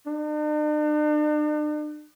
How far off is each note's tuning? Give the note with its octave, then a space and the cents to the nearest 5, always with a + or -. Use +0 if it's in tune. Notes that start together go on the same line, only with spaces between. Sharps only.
D4 +45